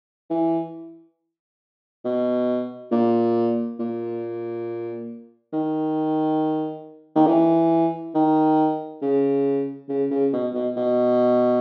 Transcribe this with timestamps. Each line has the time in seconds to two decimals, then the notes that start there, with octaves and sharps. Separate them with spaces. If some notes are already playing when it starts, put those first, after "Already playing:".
0.30 E3
2.05 B2
2.91 A#2
3.79 A#2
5.53 D#3
7.16 D#3
7.27 E3
8.15 D#3
9.02 C#3
9.89 C#3
10.11 C#3
10.33 B2
10.54 B2
10.77 B2